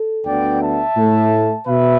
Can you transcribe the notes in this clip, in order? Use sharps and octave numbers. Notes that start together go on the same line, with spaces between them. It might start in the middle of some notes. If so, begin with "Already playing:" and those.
Already playing: A4
D2 D3 B3 D5 G5
E5 A5
A2 A3
B2 B4 E5